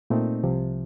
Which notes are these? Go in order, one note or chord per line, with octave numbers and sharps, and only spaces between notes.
A#2 A3 C4 D#4
C2 C3 F3